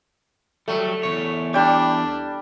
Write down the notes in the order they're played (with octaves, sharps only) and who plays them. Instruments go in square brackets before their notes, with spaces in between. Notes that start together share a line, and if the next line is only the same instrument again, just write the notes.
[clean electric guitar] F#3 G3 [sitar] A3
[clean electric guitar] E2 B2 C#5
[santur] G3 G5 [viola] D4